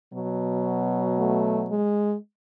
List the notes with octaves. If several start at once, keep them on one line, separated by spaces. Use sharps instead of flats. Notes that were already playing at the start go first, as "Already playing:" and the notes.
B2 F#3
A3
G#3